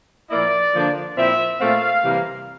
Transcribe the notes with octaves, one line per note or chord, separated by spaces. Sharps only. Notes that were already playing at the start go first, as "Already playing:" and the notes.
A#2 F3 A#3 E4 D5
D3 F3 A#3 D4 F4
A#2 F3 C4 E4 E5
A#2 A3 C4 F4 F5
C3 E3 G3 A#3